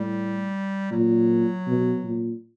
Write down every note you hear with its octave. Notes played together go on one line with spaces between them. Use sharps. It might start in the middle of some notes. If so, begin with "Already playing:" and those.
Already playing: A2 G3
A#2 F#3
B2
A#2